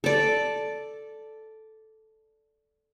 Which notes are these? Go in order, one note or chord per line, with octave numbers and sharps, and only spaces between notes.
A4 D5